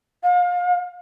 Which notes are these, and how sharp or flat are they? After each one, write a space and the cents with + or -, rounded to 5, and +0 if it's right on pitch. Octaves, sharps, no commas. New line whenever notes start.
F5 +35